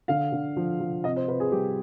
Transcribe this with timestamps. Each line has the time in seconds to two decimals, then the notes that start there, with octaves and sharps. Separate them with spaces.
0.08 D3 F5
0.32 D3
0.56 F3
0.80 F3
1.04 C3 D#5
1.16 C5
1.28 C3 B4
1.40 G#4
1.52 G3 G4